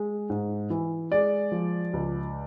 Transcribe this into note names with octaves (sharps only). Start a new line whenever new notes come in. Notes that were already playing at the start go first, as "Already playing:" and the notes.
Already playing: G#3
G#2
E3
G#3 D5
F3
C#2